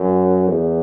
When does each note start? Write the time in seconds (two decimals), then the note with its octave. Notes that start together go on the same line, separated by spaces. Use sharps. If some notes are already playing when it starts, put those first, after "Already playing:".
Already playing: F#2
0.48 E2